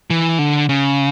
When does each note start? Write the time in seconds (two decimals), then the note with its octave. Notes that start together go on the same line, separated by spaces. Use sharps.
0.10 E3
0.39 D3
0.69 C#3